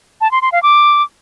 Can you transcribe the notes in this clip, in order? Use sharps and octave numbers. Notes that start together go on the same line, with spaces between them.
A5
C6
C6
F5
D6